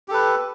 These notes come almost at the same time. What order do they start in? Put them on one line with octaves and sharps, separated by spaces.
G4 A4 B4